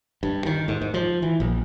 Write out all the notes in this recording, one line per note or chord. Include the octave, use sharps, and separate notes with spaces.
G2
D#3
G#2
G#2
F3
E3
A#1